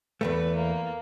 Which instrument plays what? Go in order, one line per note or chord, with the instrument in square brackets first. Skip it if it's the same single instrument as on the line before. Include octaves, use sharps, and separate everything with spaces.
[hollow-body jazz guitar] E2 G#2 A3 [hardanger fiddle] B4
[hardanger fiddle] A#3